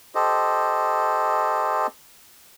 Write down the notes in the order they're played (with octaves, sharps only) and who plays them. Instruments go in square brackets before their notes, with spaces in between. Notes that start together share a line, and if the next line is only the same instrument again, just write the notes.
[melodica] G4 A4 C5 D#5